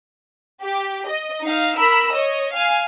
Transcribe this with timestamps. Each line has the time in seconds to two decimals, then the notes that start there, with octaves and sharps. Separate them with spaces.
0.62 G4
1.08 D#5
1.42 D#4 F5
1.76 A#4 B5 E6
2.13 C#5 D#5
2.52 F5 G#5